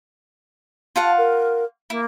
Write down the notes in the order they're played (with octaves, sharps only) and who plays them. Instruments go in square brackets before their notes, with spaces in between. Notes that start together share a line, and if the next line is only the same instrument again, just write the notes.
[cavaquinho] F4 F5 F#5 [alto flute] A5
[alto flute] A#4
[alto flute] A#3 [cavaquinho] E4